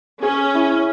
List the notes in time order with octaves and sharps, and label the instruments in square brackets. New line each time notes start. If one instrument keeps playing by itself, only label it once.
[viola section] C#4 [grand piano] G#4
[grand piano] E4